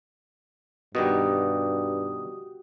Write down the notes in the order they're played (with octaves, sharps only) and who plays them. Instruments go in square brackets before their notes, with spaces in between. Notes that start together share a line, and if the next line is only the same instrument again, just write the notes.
[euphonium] G2 [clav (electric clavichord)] B2 D#3 G3 [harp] F#4 G4 [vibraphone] D#6